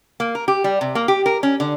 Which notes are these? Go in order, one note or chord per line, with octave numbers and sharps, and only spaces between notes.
A#3
A#4
G4
G3
C3
A#3
G4
A#4
C#4
D3